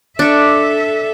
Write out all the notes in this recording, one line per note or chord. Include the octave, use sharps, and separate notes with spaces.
D4 A4 E5 C#6